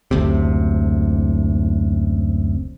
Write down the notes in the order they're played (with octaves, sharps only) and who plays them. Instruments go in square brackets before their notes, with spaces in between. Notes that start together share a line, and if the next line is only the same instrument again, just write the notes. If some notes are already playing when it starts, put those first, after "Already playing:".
[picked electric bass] F#1 D2 C3